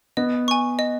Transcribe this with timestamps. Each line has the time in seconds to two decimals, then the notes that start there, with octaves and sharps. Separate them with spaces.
0.17 B3 D#5
0.48 G#5 C#6
0.79 D#5